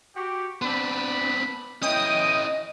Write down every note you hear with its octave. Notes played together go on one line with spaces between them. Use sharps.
F#4 G4
B3 C4 D4 B5
B3 C#4 E4 D#5 G5 D#6